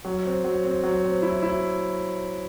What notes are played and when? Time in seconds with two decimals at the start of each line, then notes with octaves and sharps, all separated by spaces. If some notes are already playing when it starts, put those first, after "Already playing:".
0.05 F#3
0.25 C4
0.44 F#3
0.65 C4
0.83 F#3
1.03 C4
1.22 E4
1.42 E4